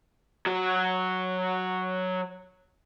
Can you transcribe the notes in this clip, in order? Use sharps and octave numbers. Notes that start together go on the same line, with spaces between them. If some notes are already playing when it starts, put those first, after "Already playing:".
F#3 F#4